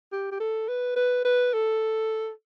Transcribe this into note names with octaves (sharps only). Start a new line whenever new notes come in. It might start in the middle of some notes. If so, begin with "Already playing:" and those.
G4
G4
A4
B4
B4
B4
A4